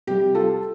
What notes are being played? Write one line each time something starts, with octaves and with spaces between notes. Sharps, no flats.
C3 G3 G4
F4 A4